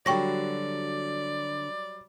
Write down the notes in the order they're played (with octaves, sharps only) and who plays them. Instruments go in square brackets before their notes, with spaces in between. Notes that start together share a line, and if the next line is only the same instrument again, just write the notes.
[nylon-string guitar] D3 F#4 [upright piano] F#3 G3 [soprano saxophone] D5 [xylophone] G5 C#6 A#6